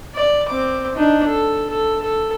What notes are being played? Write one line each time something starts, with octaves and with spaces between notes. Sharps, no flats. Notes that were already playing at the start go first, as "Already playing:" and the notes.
D5
C4 D6
D4 D#4
A4
A4
A4